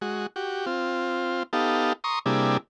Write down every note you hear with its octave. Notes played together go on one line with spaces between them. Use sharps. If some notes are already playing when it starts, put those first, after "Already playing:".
G#3 F#4
F#4 G4
C4 F4
B3 D#4 G4 A4 F5
A#5 C6 C#6 D#6
C3 G3 A#3 D4 E4 G#4